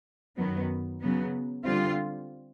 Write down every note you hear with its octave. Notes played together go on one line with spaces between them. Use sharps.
F#2 D#3 F#3 B3
C#3 F#3 B3
D3 G3 C4 F4